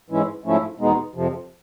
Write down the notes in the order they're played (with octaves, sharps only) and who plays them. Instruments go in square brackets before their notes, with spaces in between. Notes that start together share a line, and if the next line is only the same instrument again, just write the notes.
[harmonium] G#2 E3 G#3 C#4 E4
G#2 F3 A3 C#4 E4
E2 B2 G#3 B3 D#4
F2 C3 F3